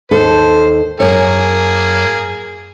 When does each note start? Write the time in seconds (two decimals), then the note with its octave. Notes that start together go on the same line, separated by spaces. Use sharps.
0.11 D#2 D#4 A4 C5
1.00 F#2 A#3 G#4 C#5